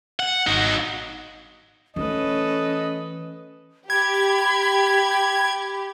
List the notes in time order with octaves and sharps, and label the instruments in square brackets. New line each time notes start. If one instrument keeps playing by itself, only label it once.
[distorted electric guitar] F#5
[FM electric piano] G#1 [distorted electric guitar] D#4 F#4
[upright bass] E3 A3 [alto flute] C#4 [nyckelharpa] A4 B4 [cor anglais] D#5
[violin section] G4 [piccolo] B5 [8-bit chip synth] G#6